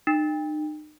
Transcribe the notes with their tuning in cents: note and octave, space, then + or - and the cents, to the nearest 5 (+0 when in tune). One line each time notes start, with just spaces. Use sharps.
D#4 -40